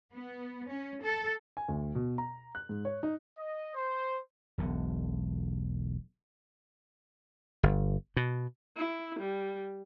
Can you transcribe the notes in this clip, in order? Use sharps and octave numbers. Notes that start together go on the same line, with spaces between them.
B3
C#4
A4
G#5
D2
B2
A#5
F#6
G#2
C#5
D#4
D#5
C5
E1 B1 D3
G1
B2
E4
G3